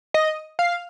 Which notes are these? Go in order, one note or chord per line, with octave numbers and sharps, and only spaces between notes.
D#5
F5